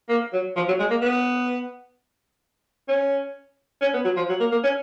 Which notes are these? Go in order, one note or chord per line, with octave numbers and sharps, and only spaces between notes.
A#3
F#3
F3
F#3
G#3
A#3
B3
C#4
C#4
B3
F#3
F3
F#3
A#3
A#3
C#4